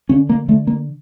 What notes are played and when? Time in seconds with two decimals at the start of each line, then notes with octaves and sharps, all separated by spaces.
0.09 D3 C#4
0.29 A#3
0.48 D3 A3
0.67 A#3